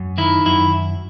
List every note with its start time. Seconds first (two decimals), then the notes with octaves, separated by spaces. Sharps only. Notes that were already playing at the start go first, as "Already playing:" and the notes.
Already playing: F#2
0.18 D#3 E4
0.46 F#2 E4